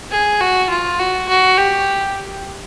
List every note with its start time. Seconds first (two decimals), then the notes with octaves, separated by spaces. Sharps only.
0.12 G#4
0.41 F#4
0.70 F4
0.99 F#4
1.29 F#4
1.58 G4